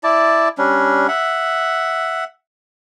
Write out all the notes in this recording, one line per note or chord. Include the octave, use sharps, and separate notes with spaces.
E4 D5 A5
G3 C#4 D4
E5 F#5